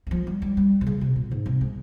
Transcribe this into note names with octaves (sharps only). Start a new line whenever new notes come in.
D#3
F3
G3
G3
G3
C3
C#3
C3
A#2
G#2
C3
G#3